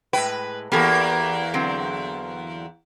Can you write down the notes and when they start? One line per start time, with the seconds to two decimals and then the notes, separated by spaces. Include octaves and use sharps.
0.13 A2 G#3 B4 G5
0.72 E2 A#3 B3 G4 A4
1.54 D3 F#3 C4